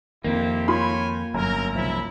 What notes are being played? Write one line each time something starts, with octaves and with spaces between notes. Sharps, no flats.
F2 D#3 A#3 C4 E4 G4
F4 C#5 G5 G#5 B5 C6
G1 F#2 A#4
C2 G#2 F3 E4